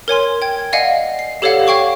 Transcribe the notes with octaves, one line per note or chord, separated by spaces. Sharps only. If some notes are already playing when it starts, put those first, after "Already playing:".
A#4 C#5 G#5 C6
G5 G#6
D5 D#5 F5 F#5 G#5
C7
G4 A4 C#5 D5 F5 F#5
C#5 F5 G5 C#6 D6